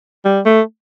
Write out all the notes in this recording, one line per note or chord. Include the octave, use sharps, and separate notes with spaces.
G3
A3